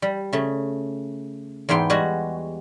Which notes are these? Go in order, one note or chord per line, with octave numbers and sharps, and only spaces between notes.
G3
C#3 A3
E2 G#2 B3 G5 C6
G3 G#3 F#4